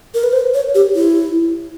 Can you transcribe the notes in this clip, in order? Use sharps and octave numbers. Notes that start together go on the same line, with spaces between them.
A#4
B4
C5
C#5
G4
E4